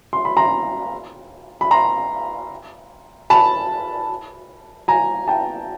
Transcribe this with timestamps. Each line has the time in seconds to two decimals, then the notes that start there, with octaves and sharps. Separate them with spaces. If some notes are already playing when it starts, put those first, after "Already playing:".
0.13 C6
0.25 B5
0.37 A#5 C6
1.61 B5
1.71 A#5 C6
3.30 A5 B5
4.88 G#5 A#5
5.28 G5 A5